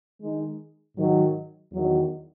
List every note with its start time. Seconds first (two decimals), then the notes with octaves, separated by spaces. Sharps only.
0.19 D#3 G#3 D#4
0.95 G#2 D#3 F#3
1.72 E2 D#3 F#3